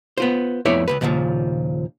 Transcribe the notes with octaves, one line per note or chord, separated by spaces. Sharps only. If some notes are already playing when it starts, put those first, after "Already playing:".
B3 F4 C5
F2 A3 B3 E4 C#5 D5
C#2 F#2 B4
D#2 A#2 C#3 E3 F3